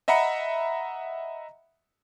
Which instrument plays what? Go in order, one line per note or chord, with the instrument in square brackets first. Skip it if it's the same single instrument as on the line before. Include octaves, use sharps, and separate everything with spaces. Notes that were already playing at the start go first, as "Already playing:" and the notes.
[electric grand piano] D#5 E5 F#5 A#5 B5 C#7